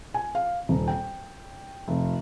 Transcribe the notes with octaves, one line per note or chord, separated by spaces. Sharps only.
G#5
F5
D#1
G5
F1